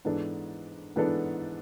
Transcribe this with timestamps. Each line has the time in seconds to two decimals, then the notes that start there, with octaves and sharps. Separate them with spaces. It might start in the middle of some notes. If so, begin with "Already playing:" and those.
0.05 G#2 E3 B3 D4 A4
0.96 G#2 E3 B3 D4 A4